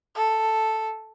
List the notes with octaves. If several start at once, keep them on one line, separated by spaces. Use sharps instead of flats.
A4